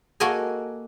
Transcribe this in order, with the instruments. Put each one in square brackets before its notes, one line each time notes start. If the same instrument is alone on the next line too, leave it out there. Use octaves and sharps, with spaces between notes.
[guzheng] A#3 F#4 A4 A#4 D#5 G#5